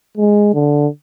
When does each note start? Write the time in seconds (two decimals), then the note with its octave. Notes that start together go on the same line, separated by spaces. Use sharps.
0.17 G#3
0.54 D3